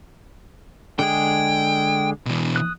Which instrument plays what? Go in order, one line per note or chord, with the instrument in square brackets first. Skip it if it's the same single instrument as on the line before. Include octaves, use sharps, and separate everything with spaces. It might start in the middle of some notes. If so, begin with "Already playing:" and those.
[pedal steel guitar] D3 G#3 G#4 [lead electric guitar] G5
[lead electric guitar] B2 E3
[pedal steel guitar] D#6 F#6